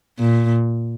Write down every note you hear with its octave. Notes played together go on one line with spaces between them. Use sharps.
A#2